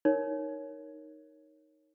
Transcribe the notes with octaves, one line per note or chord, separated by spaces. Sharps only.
D#4 A#4 C#5